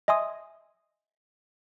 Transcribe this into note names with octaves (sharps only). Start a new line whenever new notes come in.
D#5 E5 G#5 C6 D#6